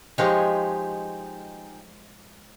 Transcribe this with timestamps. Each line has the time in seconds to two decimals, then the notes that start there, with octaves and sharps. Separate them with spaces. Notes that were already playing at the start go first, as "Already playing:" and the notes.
0.18 F3 G#3 D#4 G4 C#5 G#5